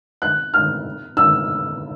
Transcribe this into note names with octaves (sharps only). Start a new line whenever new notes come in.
F#6
F6
E6